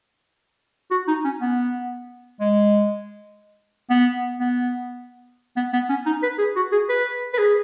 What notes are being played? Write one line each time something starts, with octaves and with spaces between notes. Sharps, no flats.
F#4
D#4
C#4
B3
G#3
B3
B3
B3
B3
C#4
D#4
B4
G#4
F#4
G#4
B4
B4
G#4